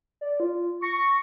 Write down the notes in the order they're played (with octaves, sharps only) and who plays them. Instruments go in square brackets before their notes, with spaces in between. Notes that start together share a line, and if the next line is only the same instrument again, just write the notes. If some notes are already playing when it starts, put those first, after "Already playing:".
[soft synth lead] D5
F4
[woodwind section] C#6 [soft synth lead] A#6